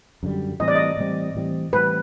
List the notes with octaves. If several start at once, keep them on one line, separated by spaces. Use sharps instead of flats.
F#2 D3 G3
A2 E3 G3 C4 D#5
D5
D#5
A2 E3 G3 C4
A2 E3 G3 C4
A2 E3 G3 C4 B4